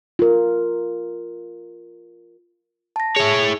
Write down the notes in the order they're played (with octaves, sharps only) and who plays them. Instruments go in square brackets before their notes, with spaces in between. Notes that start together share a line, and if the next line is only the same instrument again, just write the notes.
[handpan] F4 A#4
[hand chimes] A5 A#6
[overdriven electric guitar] E4 C#5 [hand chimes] G#4